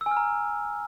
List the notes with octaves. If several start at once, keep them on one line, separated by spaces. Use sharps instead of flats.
E6
G#5
F6
A#5